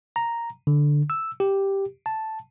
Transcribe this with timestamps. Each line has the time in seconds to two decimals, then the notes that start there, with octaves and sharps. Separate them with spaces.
0.16 A#5
0.67 D3
1.10 E6
1.40 G4
2.06 A5